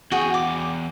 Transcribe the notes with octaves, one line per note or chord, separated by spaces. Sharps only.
E2 F#4 G#4 G5
D6